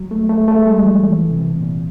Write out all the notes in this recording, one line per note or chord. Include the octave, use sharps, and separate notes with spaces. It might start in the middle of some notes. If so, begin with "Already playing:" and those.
Already playing: F#3
A3
A3
A3
G#3
G3
F3
E3
C3
A#2